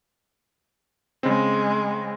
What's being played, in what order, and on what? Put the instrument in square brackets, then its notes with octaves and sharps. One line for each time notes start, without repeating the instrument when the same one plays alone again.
[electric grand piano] C#3 C4 [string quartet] G#3